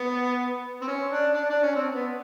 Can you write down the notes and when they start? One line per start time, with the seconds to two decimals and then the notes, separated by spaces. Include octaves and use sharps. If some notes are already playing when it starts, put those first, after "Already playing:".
Already playing: B3
0.82 C4
0.88 C#4
1.11 D4
1.34 D4
1.50 D4
1.63 C#4
1.75 C4
1.94 B3